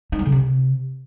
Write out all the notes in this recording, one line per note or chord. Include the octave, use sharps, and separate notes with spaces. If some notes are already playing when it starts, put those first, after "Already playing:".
D#4
F#3
C#3
C3